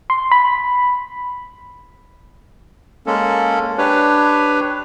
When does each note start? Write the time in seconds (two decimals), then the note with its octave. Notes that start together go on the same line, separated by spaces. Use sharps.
0.10 C6
0.31 B5
3.07 G#3 A#3 C#4 A4
3.78 D4 G4 B4 C#5